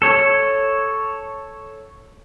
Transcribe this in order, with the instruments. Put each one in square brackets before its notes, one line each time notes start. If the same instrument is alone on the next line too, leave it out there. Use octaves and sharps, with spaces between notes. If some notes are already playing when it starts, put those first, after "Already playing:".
[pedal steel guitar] A4 C#5 [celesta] G#6 C#7